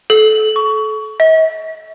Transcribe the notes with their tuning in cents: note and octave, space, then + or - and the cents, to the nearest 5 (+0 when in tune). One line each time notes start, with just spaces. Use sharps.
A4 -30
C#6 +20
D#5 +45